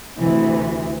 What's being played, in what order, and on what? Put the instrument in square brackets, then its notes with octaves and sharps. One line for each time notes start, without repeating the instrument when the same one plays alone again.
[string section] D2 C3 E3